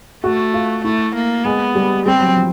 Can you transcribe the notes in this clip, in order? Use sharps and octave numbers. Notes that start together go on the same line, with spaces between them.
A3 F#4
F4
A3 E4
A#3
G#3 B3
G3
G3 C4
F#3
F3